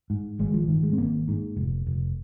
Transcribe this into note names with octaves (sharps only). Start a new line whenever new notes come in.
G#2
G#1 G#3
F3
G#2 D#3
G#3
C4
G#1 A#3
G#2
F1
F1